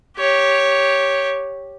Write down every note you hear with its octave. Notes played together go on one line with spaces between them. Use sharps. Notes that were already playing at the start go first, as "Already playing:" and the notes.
G4 C#5